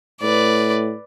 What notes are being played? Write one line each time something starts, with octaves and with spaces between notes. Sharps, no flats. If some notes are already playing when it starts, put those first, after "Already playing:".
A2 B4 D5